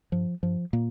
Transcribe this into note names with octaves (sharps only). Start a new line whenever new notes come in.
G2 F3
G2 F3
A#2 A#3